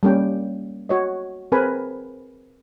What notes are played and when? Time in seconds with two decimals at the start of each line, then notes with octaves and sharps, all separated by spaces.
0.03 G3 A#3 C#4 G5
0.89 F#4 C#5 D#5
1.52 C4 G#4 A#4 B4 G#5 B5